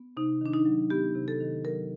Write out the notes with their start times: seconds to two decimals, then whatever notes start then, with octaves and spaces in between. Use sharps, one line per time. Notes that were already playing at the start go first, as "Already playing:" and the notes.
Already playing: B3
0.17 C3 D#4
0.41 D#3 D4
0.54 D#4
0.65 F#3
0.90 B3 G4
1.15 C3
1.28 A4
1.40 D#3
1.65 F#3 A#4